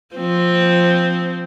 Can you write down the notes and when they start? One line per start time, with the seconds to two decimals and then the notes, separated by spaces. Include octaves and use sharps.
0.15 F3 C4